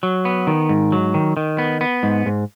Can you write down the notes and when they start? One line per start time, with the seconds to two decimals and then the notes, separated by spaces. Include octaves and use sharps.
0.03 F#3
0.25 B3
0.47 D#3
0.69 G#2
0.92 F#3
1.14 D#3
1.37 D#3
1.58 B3
1.81 B3
2.03 G#2
2.26 G#2